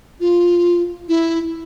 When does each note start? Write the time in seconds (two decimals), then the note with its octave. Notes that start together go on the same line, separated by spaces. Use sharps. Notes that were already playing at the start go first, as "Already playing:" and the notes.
0.20 F4
1.08 E4